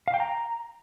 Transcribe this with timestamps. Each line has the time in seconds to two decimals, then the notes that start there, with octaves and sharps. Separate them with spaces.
0.08 F5
0.14 G5
0.20 A#5